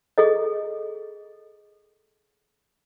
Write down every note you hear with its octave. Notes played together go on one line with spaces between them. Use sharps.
G#4 A4 D#5